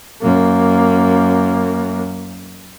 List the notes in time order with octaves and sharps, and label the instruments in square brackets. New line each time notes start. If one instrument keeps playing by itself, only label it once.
[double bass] F#2 A#3